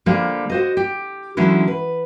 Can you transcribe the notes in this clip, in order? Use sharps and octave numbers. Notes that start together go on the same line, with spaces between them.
D3 F3 G3 A#3
F#4 C5 D#5
G4
D3 E3 F#3 G#3 C#4 E4
B4